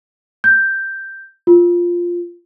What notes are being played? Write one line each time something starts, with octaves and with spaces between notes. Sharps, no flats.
G6
F4